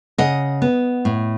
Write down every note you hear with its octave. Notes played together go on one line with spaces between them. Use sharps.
C#3 D#5 F#5
B3
A2